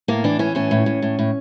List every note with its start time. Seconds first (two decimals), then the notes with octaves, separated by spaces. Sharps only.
0.08 A2 A#3
0.24 E3 D4
0.39 E3 C#4
0.55 A2 C#4
0.71 A2
0.86 A2
1.02 A2
1.19 A2